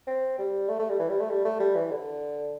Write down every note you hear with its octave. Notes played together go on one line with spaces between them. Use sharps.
C4
G3
A3
A3
G3
E3
G3
A3
G3
A3
G3
E3
D3